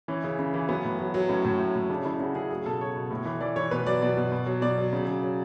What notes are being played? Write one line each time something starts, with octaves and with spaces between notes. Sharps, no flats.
E3 C#4
C#3
C#3
E3
F#3 B3
A2
F#3
F#3
A2 C#4
A2
A2
A2
C#3 D4
C#3 E4
C#3 F#4
C#3 G#4
F#3 G#4
B2 A4
F#3 C#5
B2
A2
E3
E3 D5
E3 C#5
B2 B4
F#3 D5
B2 D5
B2
B2
F#3
B2 D5
F#3
C#3
C#3
F#3